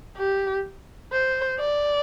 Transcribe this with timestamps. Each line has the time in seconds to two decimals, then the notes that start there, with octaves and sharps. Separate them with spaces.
0.18 G4
1.13 C5
1.60 D5